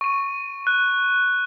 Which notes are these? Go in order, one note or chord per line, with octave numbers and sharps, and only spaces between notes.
C#6 D#7
F#6